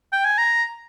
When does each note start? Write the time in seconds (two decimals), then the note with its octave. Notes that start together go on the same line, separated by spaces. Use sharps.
0.13 G5
0.25 G#5
0.38 A#5